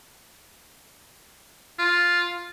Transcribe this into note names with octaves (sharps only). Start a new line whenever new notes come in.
F4